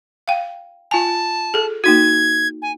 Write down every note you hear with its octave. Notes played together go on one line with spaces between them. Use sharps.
F5 G5
F4 G#5 A5
G#4 A4
A#3 D#4 F#4 G#6
G#5